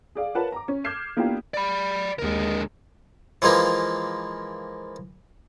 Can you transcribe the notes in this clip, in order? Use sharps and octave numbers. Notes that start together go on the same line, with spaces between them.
G#4 D5 F5
F4 A#4 B4 C#5 F#5 A5
A#5 D6
C#4
D6 F6 G6 G#6 C7 E7
A#3 B3 D4 E4 F4 G4
D5 B5
D#2 D3 G#3 A#4
E3 F3 G#3 A#3